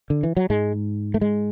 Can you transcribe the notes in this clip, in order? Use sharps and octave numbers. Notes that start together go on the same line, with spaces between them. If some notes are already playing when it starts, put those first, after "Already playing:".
D3
E3
F#3
G#2 G#3
A3
G#3